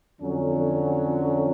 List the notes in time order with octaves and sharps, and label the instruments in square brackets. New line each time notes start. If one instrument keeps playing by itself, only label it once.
[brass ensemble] F2 D3 F#3 C#4